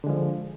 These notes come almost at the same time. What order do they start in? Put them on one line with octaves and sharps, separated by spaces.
D3 G#3 F3